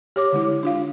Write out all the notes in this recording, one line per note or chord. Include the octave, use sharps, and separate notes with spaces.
G4 C#5 D6
D3 G#3 E4
D4 F4 F5